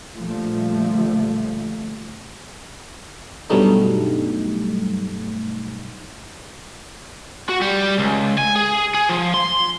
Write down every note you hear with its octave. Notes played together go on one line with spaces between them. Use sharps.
A#2 D3 F3 G3 A3
G2 B2 F#3 G3 A3 D#4
F#4
G3
C#2
G#5
G#4
G#4
F3
C6